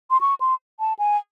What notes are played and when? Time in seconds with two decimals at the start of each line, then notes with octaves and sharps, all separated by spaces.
0.11 C6
0.21 C#6
0.40 C6
0.80 A5
0.99 G#5